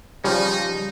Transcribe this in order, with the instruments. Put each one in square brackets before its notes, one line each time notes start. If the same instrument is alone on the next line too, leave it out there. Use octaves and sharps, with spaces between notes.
[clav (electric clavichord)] C#3 F3 [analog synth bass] G3 [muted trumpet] D#4